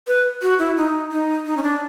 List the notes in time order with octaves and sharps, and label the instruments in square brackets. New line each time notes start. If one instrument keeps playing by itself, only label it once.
[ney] B4
F#4
E4
D#4
D#4
D#4
C#4
D4